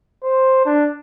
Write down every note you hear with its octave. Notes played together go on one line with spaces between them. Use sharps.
C5
D4